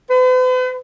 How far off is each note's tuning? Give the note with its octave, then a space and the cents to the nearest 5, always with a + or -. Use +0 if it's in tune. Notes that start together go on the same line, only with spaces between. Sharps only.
B4 +45